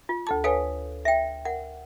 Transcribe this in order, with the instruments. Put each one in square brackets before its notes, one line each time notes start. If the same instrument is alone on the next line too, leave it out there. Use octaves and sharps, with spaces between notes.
[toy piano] F4
[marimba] D2 A4 A5
[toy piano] A4 F5 [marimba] B4 C#5 G#5
[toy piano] E5 G5
[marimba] A#4 [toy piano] F#5